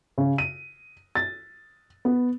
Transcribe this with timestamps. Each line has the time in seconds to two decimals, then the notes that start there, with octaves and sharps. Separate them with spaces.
0.18 C#3
0.38 D#7
1.15 A6
2.05 B3